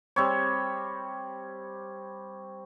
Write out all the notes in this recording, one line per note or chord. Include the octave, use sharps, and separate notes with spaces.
G3 C4 C#5